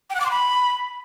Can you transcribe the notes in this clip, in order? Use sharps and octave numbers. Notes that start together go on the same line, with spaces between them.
G5
F#5
D6
C6
B5